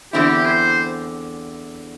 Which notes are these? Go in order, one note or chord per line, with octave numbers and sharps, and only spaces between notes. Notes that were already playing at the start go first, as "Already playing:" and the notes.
E2 D3 C4 E4 G4
C5